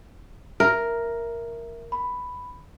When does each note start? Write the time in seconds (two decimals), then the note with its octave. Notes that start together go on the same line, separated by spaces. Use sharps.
0.60 A#4 E5
1.92 B5